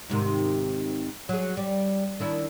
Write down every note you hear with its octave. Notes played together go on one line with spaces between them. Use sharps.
G#2 C3 D#3
F#3 G#4
G3
D#3 D4 E4